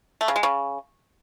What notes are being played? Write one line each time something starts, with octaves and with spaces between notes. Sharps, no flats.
A3
C#3
G#3
C#3